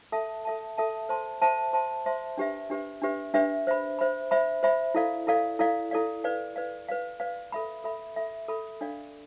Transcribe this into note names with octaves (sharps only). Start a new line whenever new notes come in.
A4 E5 A5
A4 E5 A5
A4 E5 A5
C5 E5 A5 C6
C5 E5 A5 C6
C5 E5 A5 C6
C5 E5 A5 C6
D4 G4 B4 E5
D4 G4 B4 E5
D4 G4 B4 E5
D4 G4 B4 E5
C5 E5 B5
C5 E5 B5
C5 E5 B5
C5 E5 B5
E4 A4 D5 F5
E4 A4 D5 F5
E4 A4 D5 F5
E4 A4 D5 F5
B4 D5 F5
B4 D5 F5
B4 D5 F5
B4 D5 F5
A4 E5 B5
A4 E5 B5
A4 E5 B5
A4 E5 B5
D4 A4 D5 F5